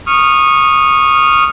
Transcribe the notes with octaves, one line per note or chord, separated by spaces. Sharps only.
C#6 D#6 F6